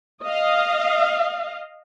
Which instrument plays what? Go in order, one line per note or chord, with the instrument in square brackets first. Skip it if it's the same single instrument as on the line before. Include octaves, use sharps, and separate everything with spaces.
[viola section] D#5 F5